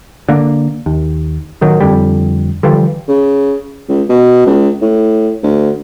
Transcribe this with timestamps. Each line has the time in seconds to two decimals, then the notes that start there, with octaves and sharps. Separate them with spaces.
0.29 D3 A#3
0.86 D#2
1.61 A1 D#3 F#3
1.80 F2 D3 G3
2.63 D3 E3 F3 G3
3.08 C#3
3.89 C#2
4.09 B2
4.46 C#2
4.82 A2
5.43 D2